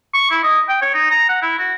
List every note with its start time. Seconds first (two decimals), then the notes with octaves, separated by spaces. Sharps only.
0.14 C#6
0.31 E4
0.43 D#5
0.69 G5
0.82 C#5
0.94 D#4
1.10 A#5
1.29 F#5
1.42 E4
1.58 F#4